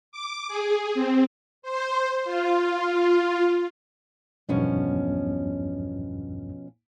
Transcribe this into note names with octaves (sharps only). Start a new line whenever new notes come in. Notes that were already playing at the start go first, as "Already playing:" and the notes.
D6
G#4
C4
C5
F4
B1 E2 G2 B2 F3 C#4